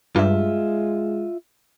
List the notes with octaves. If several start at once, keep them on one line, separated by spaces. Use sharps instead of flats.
G2 G#3 F4 E5